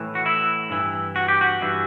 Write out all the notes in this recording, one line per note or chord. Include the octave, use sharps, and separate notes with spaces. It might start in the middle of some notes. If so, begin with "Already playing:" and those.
Already playing: A2 E3
F#4
E4
G2 E3
F#4
G4
F#4
G2 E3